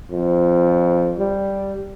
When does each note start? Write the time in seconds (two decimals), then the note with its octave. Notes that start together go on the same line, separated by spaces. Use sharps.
0.11 F2
1.19 G3